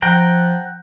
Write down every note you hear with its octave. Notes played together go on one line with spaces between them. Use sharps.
F3 F#5 G5 A#5